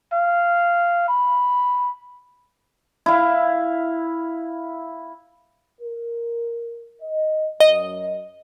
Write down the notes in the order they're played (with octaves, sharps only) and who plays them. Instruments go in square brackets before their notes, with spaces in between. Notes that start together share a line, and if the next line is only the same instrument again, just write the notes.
[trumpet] F5
B5
[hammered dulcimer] E4 F5
[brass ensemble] A#4
D#5
[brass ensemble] F#2 [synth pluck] D#5